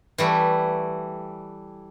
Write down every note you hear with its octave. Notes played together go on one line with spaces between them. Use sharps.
E3 G3 A3